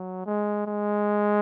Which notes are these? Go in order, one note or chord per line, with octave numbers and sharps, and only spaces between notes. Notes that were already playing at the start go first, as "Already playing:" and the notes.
Already playing: F#3
G#3
G#3